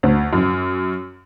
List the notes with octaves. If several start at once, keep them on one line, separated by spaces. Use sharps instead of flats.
D2
F#2